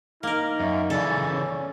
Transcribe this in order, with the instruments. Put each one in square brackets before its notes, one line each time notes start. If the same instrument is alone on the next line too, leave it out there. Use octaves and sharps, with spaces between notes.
[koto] A#3 A#4 [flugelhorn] D#4 [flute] F6
[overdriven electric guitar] F#2 [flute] E5
[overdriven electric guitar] C#3 E3 [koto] A4 [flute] D5
[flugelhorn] C#4